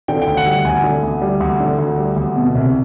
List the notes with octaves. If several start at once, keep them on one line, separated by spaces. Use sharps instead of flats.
D3 G5
G5
D2
F#5
G3
F#5
D2 G#5
D3
D2
G3
D2
D3
D2
G3
D2
B2
C2